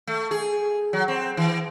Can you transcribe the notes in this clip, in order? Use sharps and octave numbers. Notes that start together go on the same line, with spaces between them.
A3
G#4
F#3
C4
E3